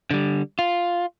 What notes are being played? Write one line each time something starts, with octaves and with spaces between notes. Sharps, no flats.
D3 G3
F4